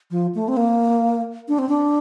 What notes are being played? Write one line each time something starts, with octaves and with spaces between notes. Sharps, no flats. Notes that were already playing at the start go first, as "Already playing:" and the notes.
F3
A3
C4
A#3
D4
C4
D4